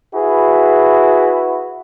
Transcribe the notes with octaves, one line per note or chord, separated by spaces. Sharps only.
E4 F#4 G#4 B4